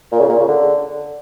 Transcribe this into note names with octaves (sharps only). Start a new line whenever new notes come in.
A#2
C#3
A#2
C#3
D3